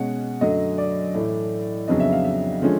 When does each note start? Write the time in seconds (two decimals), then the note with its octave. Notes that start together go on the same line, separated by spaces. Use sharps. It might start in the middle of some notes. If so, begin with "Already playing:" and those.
Already playing: B2 G#3 C#4 F#5
0.41 F#2 D3 F#3 A3 D#5
0.78 D5
1.14 A2 E3 A3
1.88 F2 C#3 F#3 B3 D4 D#5
2.00 E5
2.13 F5
2.25 E5
2.62 D3 F3 G#3 C#4